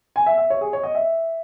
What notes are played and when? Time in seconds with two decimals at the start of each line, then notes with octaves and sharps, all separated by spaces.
0.16 G#5
0.26 E5
0.38 E5
0.50 C#5
0.61 G#4
0.73 C#5
0.83 D#5
0.95 E5